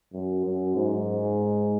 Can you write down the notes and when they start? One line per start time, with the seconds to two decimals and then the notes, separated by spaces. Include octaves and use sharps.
0.13 F#2
0.45 F#2
0.76 G#2